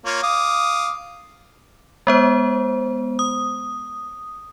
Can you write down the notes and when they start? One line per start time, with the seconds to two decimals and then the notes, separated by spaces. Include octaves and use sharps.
0.06 A#3 F4 C#5
0.23 F5 D6 D#6
2.07 G#3 B3 C5
3.19 D#6